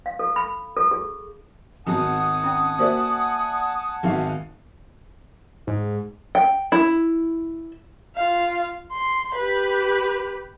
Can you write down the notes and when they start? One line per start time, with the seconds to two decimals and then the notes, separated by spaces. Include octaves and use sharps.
0.06 F5
0.19 A4
0.36 B5
0.77 A4
0.91 G#4
1.87 G#1 B3 C4 F#4 F#5 G#5 A5 D#6
2.44 C#4 G5
2.78 A#3 F#4 A#4 C5 D5 E5
4.03 G#1 B3 D#4 F#4 E5 F5
5.67 G#2
6.35 G5
6.72 E4
8.16 F4 F5
8.92 C6
9.35 G4 B4